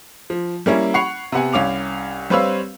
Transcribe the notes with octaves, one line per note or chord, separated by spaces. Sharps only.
F3
G3 A#3 C#4 E4
F#5 B5 C#6 C7 F7
C3 B3 F#5 G#5
C2 C#4 F5 D6 F7
G3 C4 B4 C#5 F5 E6